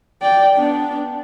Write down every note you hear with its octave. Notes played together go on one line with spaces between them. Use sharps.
D5 G5
B3 D4